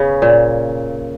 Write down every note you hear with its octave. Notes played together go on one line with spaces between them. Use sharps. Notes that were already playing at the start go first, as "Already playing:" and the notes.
Already playing: C#3 B3 C#4
A#2